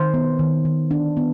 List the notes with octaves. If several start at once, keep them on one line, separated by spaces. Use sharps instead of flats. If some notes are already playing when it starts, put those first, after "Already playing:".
Already playing: D#3 C5
B3
D#3
D#3
D4
B3